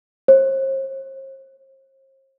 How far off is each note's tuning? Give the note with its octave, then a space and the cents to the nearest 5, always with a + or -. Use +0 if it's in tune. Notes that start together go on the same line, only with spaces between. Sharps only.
C5 +40